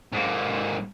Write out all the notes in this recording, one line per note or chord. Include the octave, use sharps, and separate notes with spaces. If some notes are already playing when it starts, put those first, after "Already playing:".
G#2 A#3